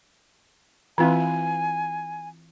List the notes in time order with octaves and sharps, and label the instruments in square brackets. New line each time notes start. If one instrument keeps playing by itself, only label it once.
[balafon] E3 C4 [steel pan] E4 F4 B4 [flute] G#5